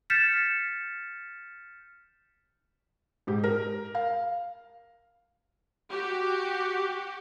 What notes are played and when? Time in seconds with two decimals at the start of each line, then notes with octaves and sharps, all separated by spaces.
0.10 F6 G6 A6 B6 C#7 E7
3.27 G#2 G4
3.43 A#4
3.95 F5
5.91 F#4 G4